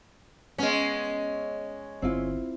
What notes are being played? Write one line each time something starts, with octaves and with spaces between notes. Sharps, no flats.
G#3 B3 C#4
G1 C4 E4 F4